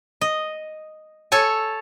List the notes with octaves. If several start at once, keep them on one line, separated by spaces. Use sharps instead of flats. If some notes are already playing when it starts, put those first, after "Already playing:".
D#5
A4 C#5 G#5